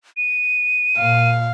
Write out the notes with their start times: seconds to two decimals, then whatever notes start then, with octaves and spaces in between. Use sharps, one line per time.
0.17 D#7
0.98 A#2 F5